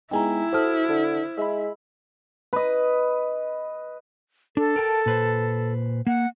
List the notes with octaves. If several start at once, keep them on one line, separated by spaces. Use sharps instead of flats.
G#3 B3 D#4 E4 G5 G#5 A#5
F#4 A4 C5 D#6 F6
D3
G#3 E5 B5
B4 D#5
D4 A4
A#4 G5 A5
A#2 B4 C5
A#3 F#5